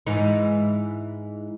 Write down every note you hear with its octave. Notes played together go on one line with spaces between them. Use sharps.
G#2 E3 D#4